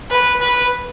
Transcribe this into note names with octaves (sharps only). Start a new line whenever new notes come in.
B4
B4